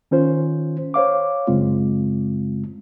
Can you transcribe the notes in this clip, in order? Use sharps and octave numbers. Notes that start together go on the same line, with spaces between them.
D#3 C#4 F4 C5
C5 C#5 F5 D6
F#2 C#3 G#3 C4 F4